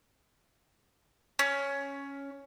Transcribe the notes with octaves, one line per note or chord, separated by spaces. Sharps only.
C#4